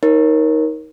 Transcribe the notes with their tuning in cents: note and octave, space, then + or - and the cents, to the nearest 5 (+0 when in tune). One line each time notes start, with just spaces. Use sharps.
D#4 +15 A#4 +10 C#5 -25